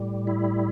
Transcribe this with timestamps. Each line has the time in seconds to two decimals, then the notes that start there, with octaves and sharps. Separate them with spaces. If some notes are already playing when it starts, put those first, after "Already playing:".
Already playing: A2 G3
0.27 E4